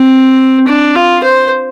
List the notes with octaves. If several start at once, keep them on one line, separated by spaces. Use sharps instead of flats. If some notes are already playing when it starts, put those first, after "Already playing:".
Already playing: C4
D4
F4
C5